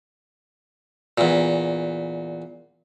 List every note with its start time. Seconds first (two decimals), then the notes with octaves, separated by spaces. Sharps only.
1.18 E2 A#2